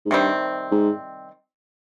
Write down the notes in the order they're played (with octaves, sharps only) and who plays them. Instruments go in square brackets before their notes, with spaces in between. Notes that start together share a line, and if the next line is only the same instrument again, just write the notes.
[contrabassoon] G#2
[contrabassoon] G2 [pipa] C3 D#3 G3 C4
[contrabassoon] G#2